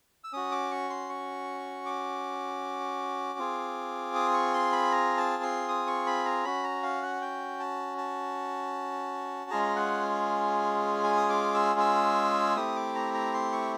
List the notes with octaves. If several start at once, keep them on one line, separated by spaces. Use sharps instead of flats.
E6
C#4 F#4 D#6
D6
C#6
C6
C#6
D6
C4 F4 G#4
D#6
C#6
C6
B5
A#5
A5
C6
D#6
C#6
B5
A#5
C#4 F#4 B5
A#5
F5
F#5
G5
A5
A5
G#3 C#4 F4 G#4 A#5
F#5
G#5
D#6
D6
E6
E6
A3 C4 E4 G4 D#6
D6
A#5
A#5
C6
C#6